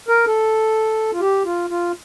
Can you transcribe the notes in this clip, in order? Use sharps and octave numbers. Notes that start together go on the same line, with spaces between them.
A#4
A4
F4
G4
F4
F4